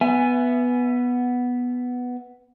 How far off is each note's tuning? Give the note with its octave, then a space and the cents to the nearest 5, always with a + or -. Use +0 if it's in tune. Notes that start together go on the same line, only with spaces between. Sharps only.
B3 +0 E5 +35 G#5 +0